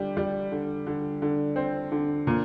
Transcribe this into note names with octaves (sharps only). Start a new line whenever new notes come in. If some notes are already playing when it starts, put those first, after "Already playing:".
Already playing: D3 G3
G3
D3
D3
D3
C4
D3
A#2